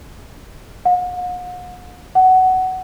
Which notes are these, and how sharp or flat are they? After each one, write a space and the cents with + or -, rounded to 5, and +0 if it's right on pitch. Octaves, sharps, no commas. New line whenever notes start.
F#5 -45
F#5 +15